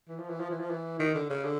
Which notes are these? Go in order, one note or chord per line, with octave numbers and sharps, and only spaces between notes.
E3
F3
E3
F3
E3
F3
E3
D#3
D3
C#3
D3